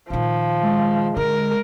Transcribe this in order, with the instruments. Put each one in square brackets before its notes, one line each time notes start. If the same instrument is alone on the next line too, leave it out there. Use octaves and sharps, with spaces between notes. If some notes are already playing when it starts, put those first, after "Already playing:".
[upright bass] A#2 D#3 [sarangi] F3
[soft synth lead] G#3
[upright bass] D3 [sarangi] A#4